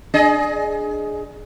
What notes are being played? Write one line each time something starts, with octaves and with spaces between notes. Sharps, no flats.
D4 G#4 D#5